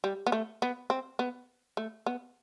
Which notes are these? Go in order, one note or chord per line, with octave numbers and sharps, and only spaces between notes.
G3
B3
A3
B3
C4
B3
A3
B3